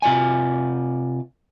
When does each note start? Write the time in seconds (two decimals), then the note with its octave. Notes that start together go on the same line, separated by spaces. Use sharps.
0.02 C3 F4 D5 G#5